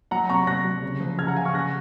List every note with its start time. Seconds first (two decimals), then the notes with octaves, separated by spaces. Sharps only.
0.11 F#3 F#5 A#5
0.29 C3 A#5 C#6
0.47 F#3 F#6 A#6
0.64 F#3
0.82 C#3
1.00 F3
1.19 C#3 F6 G#6
1.27 F#5 A#5
1.36 C#3 F5 G#5
1.45 C#6 F6
1.54 C#3 F#6 A#6